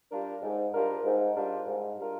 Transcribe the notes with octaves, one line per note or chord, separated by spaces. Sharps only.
G3 D4 F4 A#4
G#2
G3 D4 F4 A#4
G#2
G3 D4 F4 A#4
G#2
G3 D4 F4 A#4